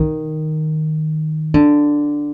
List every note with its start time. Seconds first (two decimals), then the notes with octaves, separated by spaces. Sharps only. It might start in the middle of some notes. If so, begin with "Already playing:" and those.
Already playing: D#3
1.54 D3